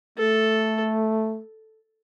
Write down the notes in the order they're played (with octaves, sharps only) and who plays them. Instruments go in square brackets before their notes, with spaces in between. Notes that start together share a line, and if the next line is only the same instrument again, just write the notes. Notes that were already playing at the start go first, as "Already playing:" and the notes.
[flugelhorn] A3 [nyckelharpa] A4